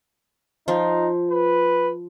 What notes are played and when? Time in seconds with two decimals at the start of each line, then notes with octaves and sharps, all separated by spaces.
0.68 F3 D#4 F4
1.31 B4